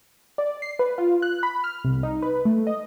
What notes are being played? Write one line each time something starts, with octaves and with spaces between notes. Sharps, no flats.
D5
C7
B4
F4
F#6
B5
F6
C2
D#4
B4
A3
D#5